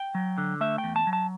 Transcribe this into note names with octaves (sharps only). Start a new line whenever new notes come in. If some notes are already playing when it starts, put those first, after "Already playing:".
Already playing: G5
F#3
D3
A3 E5
G5
E2
A5
F#3
A5